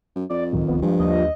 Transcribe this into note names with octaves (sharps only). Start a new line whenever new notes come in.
F#2
F2 D5
C#2 A2 D#3 F#3
D1 C#2 F3 B3
G2 F3 G#3
D#2 A#3 D#5